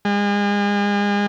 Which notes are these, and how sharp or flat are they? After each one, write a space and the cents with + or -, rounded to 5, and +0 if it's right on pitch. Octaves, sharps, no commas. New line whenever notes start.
G#3 -35